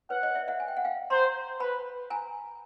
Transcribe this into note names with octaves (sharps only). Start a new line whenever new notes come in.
B4 C#5 F#5
C#5 D#5
D5 E5
E5 F#5
G#5
G5
F#5
F5 G5
C5 A#5 C6
B4 A5 B5
G#5 A#5